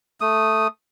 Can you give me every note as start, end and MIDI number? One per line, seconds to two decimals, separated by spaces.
0.21 0.68 57
0.21 0.68 87